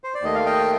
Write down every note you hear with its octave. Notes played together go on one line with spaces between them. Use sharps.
C5
D5
D#2 D#3 A3 D#5
F5
D#5 G5